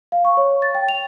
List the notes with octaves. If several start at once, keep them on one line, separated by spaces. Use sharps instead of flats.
F5
C#6
C#5
A6
G5
F7